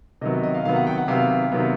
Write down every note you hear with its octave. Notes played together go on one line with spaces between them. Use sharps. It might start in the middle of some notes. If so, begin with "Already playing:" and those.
C3 D#3 F#3 B3 D#5
D#5
F5
C3 D#3 F#3 B3 F5
F#5
G5
F#5
C3 D#3 F#3 B3 F5
C3 D#3 F#3 B3